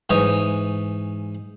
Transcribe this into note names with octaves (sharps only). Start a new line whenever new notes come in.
G#2 E3 C#5 D#5 C#6